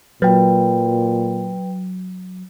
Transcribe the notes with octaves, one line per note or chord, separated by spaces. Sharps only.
A#2 F#3 B4 G5